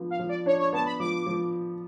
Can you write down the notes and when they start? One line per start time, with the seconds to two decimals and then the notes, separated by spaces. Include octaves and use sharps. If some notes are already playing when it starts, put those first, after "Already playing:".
Already playing: F3 B3 D4
0.10 F5
0.19 F3
0.29 D5
0.46 D4 C#5
0.60 C#5
0.73 B3 A5
0.86 B5
0.99 F3 D6
1.26 F3